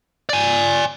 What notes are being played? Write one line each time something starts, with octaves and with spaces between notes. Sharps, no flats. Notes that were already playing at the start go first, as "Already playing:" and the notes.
D5 G#5